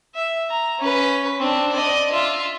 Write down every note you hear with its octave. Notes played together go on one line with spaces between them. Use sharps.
E5
A#5
C#4 B4
C4 D4
D5 D#5
F4 E5